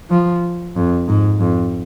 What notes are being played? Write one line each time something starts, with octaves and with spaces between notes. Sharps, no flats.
F3
F2
G#2
F2